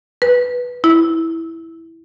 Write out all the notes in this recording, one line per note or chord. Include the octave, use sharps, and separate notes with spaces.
B4
E4